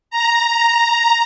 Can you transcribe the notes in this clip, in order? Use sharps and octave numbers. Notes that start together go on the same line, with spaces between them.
A#5